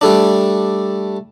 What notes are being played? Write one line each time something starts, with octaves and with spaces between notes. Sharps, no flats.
G3 A3 D4